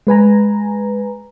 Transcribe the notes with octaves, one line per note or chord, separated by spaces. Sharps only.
G#3 B4 G#5 A#5